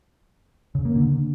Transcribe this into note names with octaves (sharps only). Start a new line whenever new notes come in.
C#3
A#3
D3